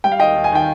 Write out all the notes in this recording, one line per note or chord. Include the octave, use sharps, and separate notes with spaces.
G3 G5
F5
D#2 D#5 G5
D#2
G#5
D#3 G5